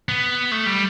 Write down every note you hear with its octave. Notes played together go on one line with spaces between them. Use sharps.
B3
A3
G3